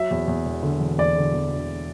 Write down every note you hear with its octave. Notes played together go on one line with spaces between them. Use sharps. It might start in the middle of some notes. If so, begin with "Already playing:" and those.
Already playing: F#3 E5
E2
E2
E1
D3
E1
E2 D5
D3
E2
D3